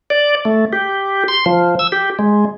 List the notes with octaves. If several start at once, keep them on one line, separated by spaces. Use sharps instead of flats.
D5
A3
G4
C6
F3
E6
G4
G#3